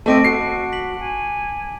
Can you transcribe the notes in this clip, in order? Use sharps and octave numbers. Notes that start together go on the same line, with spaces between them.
A3 C4 D#5 A5 D6 D7
F#4 C7
B6 F#7
G#5